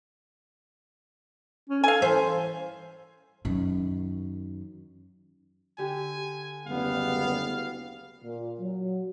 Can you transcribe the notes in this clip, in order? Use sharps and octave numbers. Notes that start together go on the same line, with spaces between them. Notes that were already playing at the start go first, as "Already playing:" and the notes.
C#4
A4 F5 G#5
E3 C5
F#2 D#3
D3 G4 G#5
F#1 D2 G3 B3 F5
A#2
F#3